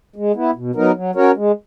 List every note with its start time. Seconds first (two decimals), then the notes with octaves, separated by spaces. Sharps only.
0.16 G#3
0.35 B3 E4
0.55 B2
0.75 F#3 B3 D#4 A#4
0.95 F#3
1.15 C#4 F#4 A#4 C#5
1.36 G#3